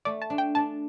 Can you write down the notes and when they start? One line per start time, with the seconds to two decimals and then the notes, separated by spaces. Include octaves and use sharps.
0.05 A3 D5
0.22 A5
0.30 D4
0.38 G5
0.55 D4 A5